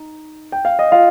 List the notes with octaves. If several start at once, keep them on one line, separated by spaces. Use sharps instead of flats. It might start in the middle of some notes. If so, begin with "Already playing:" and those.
Already playing: D#4
G5
F5
D#5
F4 F5